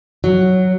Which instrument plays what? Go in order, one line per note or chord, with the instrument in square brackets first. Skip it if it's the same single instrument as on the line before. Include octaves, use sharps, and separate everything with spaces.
[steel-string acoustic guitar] F#3